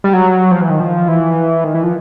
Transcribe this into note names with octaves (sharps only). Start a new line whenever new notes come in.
G3
F#3
F3
E3
D#3
F3
E3
D#3
E3
F3